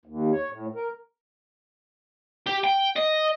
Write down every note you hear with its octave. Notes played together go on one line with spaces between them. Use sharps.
D#2
C#5
A2
A#4
G4
G5
D#5